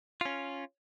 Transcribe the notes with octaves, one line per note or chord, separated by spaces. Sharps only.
C#4 F4